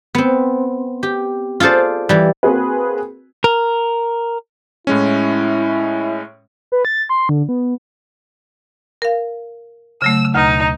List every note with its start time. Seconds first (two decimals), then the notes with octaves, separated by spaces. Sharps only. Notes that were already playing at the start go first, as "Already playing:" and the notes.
0.15 B3 C4
1.03 G4
1.60 F4 G#4 A4 C5 D5
2.09 E3 G3
2.43 A#3 C4 F#4 G#4 B4
3.44 A#4
4.87 A2 G#3 C#4 E4
6.72 B4
6.85 A6
7.09 C6
7.29 D3
7.49 B3
9.02 A#4 F5
10.02 C#3 F#3 A3 E6
10.35 D2 B2 D#4